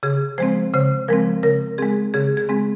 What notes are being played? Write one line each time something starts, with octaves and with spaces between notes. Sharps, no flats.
C#3 G#4
F3 G#3 C4 C5
C#3 C5
F3 G#3 C4 A#4
C#3 A#4
G#3 C4 G#4
C#3 G#4
G#4
G#3 C4